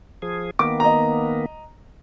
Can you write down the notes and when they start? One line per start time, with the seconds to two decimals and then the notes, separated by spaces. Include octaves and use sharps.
0.22 F3 G#4
0.59 D#3 A#3 B3 D6
0.80 D#5 A#5